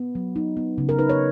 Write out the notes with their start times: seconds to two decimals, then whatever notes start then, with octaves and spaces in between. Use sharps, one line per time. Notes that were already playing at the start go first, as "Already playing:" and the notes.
Already playing: B3
0.15 F#3
0.36 D#4
0.57 B3
0.78 C#3
0.89 A#4
0.99 D#4 B4
1.09 C#5